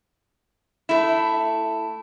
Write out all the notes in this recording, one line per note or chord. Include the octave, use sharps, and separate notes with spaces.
A3 E4